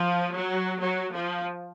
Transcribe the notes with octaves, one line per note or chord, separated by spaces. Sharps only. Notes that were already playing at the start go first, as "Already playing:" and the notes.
Already playing: F3
F#3
F#3
F3